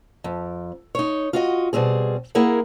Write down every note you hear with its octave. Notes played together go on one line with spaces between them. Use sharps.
F2
D#4 C#5
F4 F#4 D#5
B2 G3 C4 G#4
A#3 E4 G#4 A#4 F#5